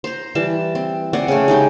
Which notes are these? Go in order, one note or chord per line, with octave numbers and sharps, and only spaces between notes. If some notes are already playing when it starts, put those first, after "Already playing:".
C5 A#5
E3 G3 A5
C4
C4 D5 F#5 G#5
C#3 A3
G#3 D#4 G4 G5